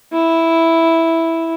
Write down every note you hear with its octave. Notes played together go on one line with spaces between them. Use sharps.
E4